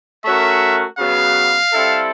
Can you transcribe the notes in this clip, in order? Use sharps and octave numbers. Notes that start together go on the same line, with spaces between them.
A3 C#4 F#4 A#4 E5
C#3 F#3 B3 F5
G3 C4 E4 A4